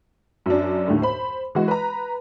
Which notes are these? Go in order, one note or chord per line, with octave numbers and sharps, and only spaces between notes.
F#2 F#3 D4
D#2 A2 D3
C5 B5
E3 G#3 F#4
B4 A#5